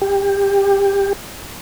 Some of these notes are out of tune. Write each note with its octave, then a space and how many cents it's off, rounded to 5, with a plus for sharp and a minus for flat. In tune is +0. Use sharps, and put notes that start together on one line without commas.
G4 +20